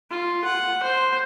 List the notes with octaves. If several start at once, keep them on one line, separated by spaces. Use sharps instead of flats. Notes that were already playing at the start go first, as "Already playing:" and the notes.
F4
F#5
C5